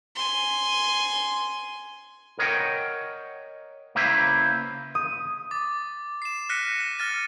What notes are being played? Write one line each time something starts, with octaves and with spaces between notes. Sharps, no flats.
G#5 C6
A#4 C#5 D#5 E5 F#5 G5
C#3 A#3 E4 B4 C5 E5
D#6
D6 A6
C7 E7
F6 F#6 A#6 B6 C#7 D#7
A#6
F6 A6 D#7